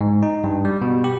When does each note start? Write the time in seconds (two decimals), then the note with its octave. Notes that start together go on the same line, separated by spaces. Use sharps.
0.01 G#2
0.23 D#4
0.44 G2
0.65 G3
0.82 B2
1.04 G4